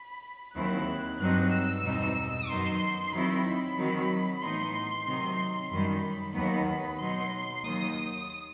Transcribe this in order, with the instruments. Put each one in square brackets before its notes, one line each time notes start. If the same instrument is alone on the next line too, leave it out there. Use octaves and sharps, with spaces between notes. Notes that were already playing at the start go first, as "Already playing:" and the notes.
Already playing: [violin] B5
[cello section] D#2 D#3 F#3 C4 E4 [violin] F#6
[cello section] G2 F#3 C4 D#4 [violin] F#6
[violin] E6
[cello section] E2 B2 G3 C4 D#4
[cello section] F#2 D#3 F#3 B3 D#4 [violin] C6
[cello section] D#3 F#3 C4 E4 [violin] B5
[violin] B5
[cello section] D#3 F#3 C4
[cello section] A2 E3 B3 D#4 [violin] C6
[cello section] C3 D#3 F#3 C4 D#4
[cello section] F#2 D#3 G3 [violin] B5
[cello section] D#2 D#3 F#3 B3 [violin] B5
[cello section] B2 F#3 B3 D#4 [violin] C6
[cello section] D#2 D#3 F#3 [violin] D#6